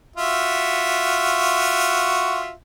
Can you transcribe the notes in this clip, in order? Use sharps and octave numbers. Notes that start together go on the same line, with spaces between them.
F4 F#4 E5